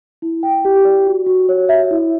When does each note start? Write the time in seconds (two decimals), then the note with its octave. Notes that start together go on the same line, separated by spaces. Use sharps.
0.22 E4
0.43 G5
0.65 G4
0.85 D5
1.07 F#4
1.27 F#4
1.49 C#5
1.69 E5
1.91 E4